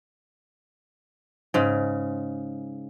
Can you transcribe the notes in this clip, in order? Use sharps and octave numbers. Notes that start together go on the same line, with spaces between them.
G#2 C#3